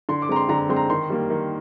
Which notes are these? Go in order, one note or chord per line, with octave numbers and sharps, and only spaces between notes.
D3 C6
D6
G#3 C4 A#5
C6
D3 A#5
G#3 C4 C6
A#5
D#3 C6
G3 A#3
D#3